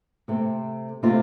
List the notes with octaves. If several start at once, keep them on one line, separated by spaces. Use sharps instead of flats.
C3 A3 C4
C3 A3 C4 F4